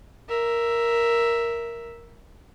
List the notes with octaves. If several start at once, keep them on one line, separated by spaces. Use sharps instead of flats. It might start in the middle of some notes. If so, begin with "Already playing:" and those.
A#4 E5